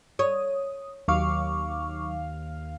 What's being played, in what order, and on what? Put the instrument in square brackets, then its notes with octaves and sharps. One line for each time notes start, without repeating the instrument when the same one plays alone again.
[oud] C#5 [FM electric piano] D#6
[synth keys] D#2 F5 [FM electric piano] F#3 C#6 D6